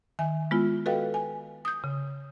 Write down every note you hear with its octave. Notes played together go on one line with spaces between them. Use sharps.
D#3 E5 G#5
G#3 B3 E4 F4
F#4 A4 B4 D#5 F5 G5
G#5
D#6 G6
C#3